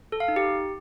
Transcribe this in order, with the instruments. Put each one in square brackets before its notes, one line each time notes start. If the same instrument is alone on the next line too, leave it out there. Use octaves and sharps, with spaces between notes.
[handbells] A4
F5
D#4
G4